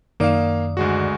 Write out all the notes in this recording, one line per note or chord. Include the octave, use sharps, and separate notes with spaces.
F#2 D#3 A#3 D5 F5
D2 G#3 F#4